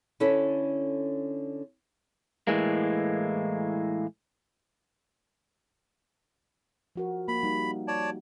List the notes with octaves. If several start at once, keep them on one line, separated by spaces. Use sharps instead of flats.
D3 C#4 E4 A4 B4 C#5
A2 E3 G#3 A#3
F3 F#4 A#4
A#3 B5
G3 D#4
C#5 D5 A5